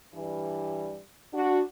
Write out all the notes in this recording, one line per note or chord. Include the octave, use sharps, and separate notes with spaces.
G2 E3 G3
D4 F#4